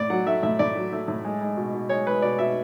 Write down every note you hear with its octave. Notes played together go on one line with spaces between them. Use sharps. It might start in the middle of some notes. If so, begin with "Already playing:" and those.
Already playing: A2 D5
F#3 F#5
A3 E5
A2 E5
A2 D5
F#3
A3
A2
G#3
G#3
B2
B2
G#3 C#5
G#3 B4
B2 D5
B2 E5